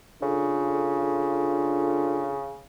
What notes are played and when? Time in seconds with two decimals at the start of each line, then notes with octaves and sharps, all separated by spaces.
0.22 C#3 D4 F4 A4